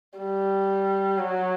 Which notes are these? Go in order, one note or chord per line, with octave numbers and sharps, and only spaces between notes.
G3
F#3